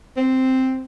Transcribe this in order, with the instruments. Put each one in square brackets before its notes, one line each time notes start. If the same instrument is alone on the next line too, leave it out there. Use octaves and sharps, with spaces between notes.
[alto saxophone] C4